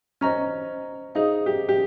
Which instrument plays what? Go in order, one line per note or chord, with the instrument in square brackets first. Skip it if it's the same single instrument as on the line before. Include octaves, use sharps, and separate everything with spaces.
[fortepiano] C#4 [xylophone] C5 D#5 A#5 F6
[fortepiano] D#4 [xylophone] G#4 C5 F5
[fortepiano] G4
G4